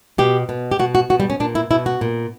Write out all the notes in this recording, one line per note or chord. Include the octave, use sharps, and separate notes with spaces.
B2 G4
B2
G4
B2 F#4
F#4
B2 F#4
G3
C#4
A#2 D4
E4
B2 E4
F#4
A#2